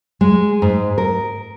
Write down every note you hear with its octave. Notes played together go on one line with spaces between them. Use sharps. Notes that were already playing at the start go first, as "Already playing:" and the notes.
G#3
G#2
A#4